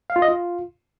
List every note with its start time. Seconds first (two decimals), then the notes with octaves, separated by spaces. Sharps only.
0.10 F5
0.16 F4
0.22 D#5
0.28 F4